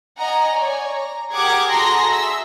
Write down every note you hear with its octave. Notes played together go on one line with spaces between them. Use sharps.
D#5 F#5 G#5 A#5
C#5 D5 G#5
A#5
G4 G#4 A#4 F#5 D6 G#6
F#4 G#4 A4 A#5 C6 A#6
E5 E6